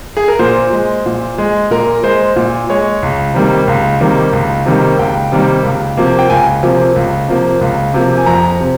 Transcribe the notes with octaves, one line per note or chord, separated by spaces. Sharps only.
G#4
A#4
A#2 C5
G#3
A#2
G#3
A#2 A#4
G#3 C5
A#2
G#3 C#5
C#2
C3 D#3 G3 A#3
C#2
C3 D#3 G3 A#3
C#2
C3 D#3 G3 A#3
C#2 G5
C3 D#3 G3 A#3
C#2
C3 F3 A#3
G5
C#2 G#5
C3 F3 A#3
C#2
C3 F3 A#3
C#2
C3 F3 A#3
G#5
F2 A#5
C3